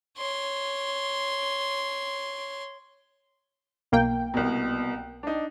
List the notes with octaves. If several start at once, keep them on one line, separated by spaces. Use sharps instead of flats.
C#5 C6
B1 A#3 G5
C2 B2
D4 D#4